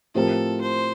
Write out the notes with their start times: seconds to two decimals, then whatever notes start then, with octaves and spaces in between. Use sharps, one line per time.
0.15 A2 F3 C4 G4 A4 A#4
0.61 C5